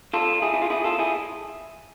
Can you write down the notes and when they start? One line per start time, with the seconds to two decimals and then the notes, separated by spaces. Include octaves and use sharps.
0.13 F4 A4
0.42 E4 G#4
0.54 E4
0.62 F4
0.70 E4 G#4
0.84 F4 A4
0.99 E4 G#4